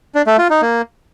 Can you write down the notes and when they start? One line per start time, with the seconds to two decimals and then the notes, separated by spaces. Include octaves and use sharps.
0.15 D4
0.27 A3
0.38 F4
0.50 D#4
0.62 A#3